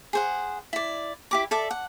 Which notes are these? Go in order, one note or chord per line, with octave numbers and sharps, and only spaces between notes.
G#4 C5 F#5
E4 D5
E4 G4 D6
A4 D5 E5
F#5